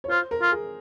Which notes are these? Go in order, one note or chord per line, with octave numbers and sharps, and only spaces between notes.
C#5
F4 C5
A#4
F4
G#4